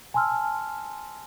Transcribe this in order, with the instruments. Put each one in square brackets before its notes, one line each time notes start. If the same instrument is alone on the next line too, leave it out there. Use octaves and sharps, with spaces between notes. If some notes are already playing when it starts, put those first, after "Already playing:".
[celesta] G#5 A5 C6 E6 F6